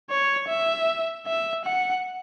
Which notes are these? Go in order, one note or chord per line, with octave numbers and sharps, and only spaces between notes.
C#5
E5
E5
F#5